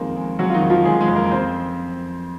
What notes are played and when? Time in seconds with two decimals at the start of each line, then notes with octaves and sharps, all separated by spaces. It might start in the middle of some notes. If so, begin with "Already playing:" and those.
Already playing: F2 D#3 G#3 A#3 C4
0.16 G#3
0.39 F#3 G#3 F#4
0.50 F4
0.54 D#3 D#4
0.62 F2
0.70 F3 F4
0.85 F2 G#3 G#4
1.01 G#3 G#4
1.08 F2
1.16 A#3 A#4
1.31 F2 C4 C5